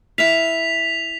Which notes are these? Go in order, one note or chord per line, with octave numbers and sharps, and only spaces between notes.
E4 E5 F5 B6 F7